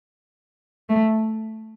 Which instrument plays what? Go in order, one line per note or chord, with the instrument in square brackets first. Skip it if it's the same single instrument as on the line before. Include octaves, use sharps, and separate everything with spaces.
[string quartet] A3